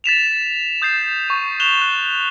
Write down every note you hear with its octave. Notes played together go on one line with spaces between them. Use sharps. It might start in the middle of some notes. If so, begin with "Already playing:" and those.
A6 B6 E7 F7
D#6 G6 A6 C7
C#6 D#7
F#6 E7 F7 G7
F#6